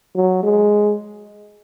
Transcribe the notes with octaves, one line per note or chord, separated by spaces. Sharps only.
F#3
G#3